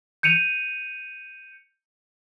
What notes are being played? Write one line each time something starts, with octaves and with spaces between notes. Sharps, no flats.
G6 C#7 D#7 F7